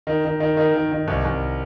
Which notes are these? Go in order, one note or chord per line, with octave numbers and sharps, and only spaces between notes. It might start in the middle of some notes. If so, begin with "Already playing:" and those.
D#3
D#3
D#3
D#3
D#3
D#3
C2
C2